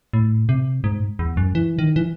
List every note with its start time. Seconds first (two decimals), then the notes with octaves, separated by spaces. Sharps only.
0.13 A2
0.49 C3
0.84 G#2
1.19 E2
1.37 F#2
1.55 E3
1.79 D#3
1.96 E3